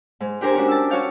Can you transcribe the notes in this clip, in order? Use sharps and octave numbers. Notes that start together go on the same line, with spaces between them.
G#2
D4 G4 A#4 C5 G#5
C#4 D4 F#4
A5 E6
F#4 C#5 F5 G5